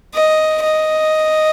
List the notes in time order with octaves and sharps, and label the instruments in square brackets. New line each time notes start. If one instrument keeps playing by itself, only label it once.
[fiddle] D#5
D#5